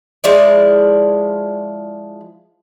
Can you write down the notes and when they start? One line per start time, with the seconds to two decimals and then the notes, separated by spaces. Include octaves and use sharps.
0.24 F3 G#3 E4 D5